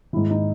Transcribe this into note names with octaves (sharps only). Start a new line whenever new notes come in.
G#2 D#3 E4
D#4